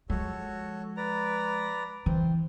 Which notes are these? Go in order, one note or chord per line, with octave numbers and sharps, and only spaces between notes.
F3 G#3 F#4 A4 C#5
B4 D5 A#5
E3 C4